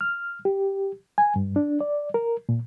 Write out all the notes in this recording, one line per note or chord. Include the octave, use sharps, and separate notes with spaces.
F6
G4
G#5
G2
D4
D5
A#4
A#2